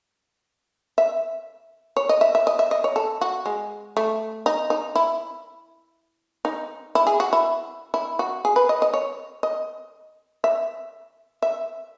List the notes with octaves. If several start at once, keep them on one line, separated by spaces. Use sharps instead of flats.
E5
C#5
D#5
E5
E5
D#5
E5
D#5
C#5
A4
F#4
G#3
A3
D#4
D#4
E4
D#4
E4
G#4
F#4
E4
E4
F#4
G#4
B4
D#5
D#5
C#5
D#5
E5
E5